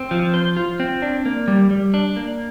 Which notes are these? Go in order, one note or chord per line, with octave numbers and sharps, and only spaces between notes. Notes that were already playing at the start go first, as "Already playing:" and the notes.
Already playing: C4
F3
C5
F4
C4
D4
A#3
G3
G3
D4
A#3